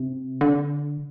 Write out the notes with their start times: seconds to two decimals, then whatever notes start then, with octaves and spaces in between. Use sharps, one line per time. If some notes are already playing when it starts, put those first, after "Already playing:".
Already playing: C3
0.41 D3